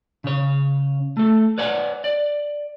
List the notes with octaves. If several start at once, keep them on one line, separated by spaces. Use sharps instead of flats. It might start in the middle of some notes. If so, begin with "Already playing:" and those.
C#3 C#5
A3 A4
B4 C#5 D5 F#5 G#5
D5